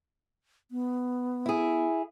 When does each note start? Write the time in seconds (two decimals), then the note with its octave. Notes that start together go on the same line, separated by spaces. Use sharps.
0.71 B3
1.46 E4 G#4